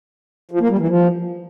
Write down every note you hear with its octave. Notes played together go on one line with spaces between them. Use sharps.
F3
A#3
G3
E3
F3